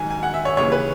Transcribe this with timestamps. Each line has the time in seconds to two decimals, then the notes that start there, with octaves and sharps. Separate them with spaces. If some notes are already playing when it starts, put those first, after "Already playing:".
Already playing: G#2 D#3 F#3 G#5
0.11 G#5
0.23 F#5
0.34 E5
0.45 C#5
0.57 D#2 C#3 E3 C#5
0.72 B4